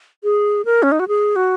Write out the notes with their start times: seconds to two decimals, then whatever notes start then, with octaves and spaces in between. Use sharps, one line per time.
0.24 G#4
0.65 A#4
0.83 C#4
0.92 D#4
1.00 F#4
1.08 G#4
1.36 F#4